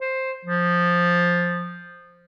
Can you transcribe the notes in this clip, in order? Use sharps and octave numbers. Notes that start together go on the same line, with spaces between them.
C5
F3